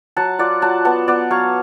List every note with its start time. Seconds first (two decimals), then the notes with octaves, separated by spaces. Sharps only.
0.17 F#3 F#5 A5
0.39 F4 D5 F#5
0.62 F#3 F#5 A5
0.85 B3 F#5 A5
1.08 B3 D5 F#5
1.30 F#3 C#5 F5